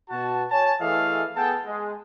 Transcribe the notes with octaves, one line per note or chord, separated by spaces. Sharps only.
B2 F#4 A5
C#5 G#5 A5
E3 A3 G#4 A4 D#5 F5
B3 G#4 A4 G5 A5
G#3